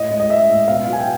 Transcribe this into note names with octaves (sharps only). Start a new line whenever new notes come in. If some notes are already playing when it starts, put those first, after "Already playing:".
Already playing: A2 D#5
G#3
D#5
G#3 E5
A2
B2 F5
F#3
G#5
G5